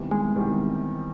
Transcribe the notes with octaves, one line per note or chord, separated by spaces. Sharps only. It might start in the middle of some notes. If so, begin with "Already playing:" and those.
Already playing: E2 C3 D#3 G3
G#3
E2 C3 D#3 G3